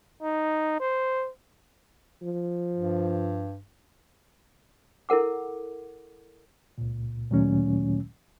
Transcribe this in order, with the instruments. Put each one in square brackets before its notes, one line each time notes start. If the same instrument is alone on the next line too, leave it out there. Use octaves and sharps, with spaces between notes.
[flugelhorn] D#4
C5
[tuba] F3
[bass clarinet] G2
[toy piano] E4 A4 A#4 F#5 D6
[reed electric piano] C#2 A#2
D2 A#2 D#3 F#3 A3 C#4